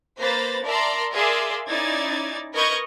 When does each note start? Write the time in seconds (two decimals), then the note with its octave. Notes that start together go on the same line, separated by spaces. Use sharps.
0.20 A#3 B4 C5 A#5 B5 A6
0.65 A#4 D5 E5 A5 A#5 C6
1.14 G#4 A#4 D5 E5 F5 C6
1.68 C#4 D#4 E4 D5 G#6 A6
2.54 A#4 B4 D#5 C#6 G6 G#6